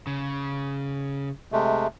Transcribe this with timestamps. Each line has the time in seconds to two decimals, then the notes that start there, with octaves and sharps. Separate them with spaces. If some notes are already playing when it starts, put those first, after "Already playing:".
0.07 C#3
1.52 C3 G#3 A3